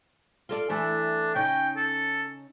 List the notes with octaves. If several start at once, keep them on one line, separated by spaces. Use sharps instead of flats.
F4 A4 D5
E3 A3 D4 E4
C#3 C#4 D#4 G5
A4